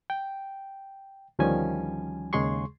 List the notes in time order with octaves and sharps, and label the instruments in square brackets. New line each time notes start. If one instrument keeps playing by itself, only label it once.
[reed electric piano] G5
D2 D#3 F3 G3 C#4 G#5
D#2 C#3 G#3 G#4 C6 C#6